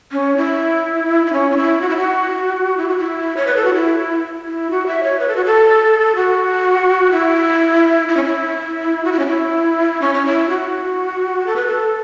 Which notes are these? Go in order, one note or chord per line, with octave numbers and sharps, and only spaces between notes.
C#4
E4
E4
C#4
C#4
E4
F#4
E4
F#4
E4
F#4
E4
C#5
B4
A4
F#4
E4
E4
F#4
E5
C#5
B4
A4
F#4
A4
F#4
E4
E4
C#4
E4
F#4
E4
C#4
E4
C#4
C#4
E4
F#4
A4
B4
A4